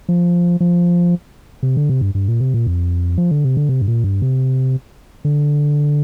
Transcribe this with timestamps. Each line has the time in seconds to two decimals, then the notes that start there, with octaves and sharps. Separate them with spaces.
0.09 F3
0.61 F3
1.63 C3
1.77 D3
1.89 C3
2.01 G2
2.15 G2
2.28 A#2
2.40 C3
2.54 A#2
2.67 F2
3.18 F3
3.31 D3
3.44 C3
3.57 D3
3.69 C3
3.81 G2
3.88 A#2
4.04 G2
4.22 C3
5.25 D3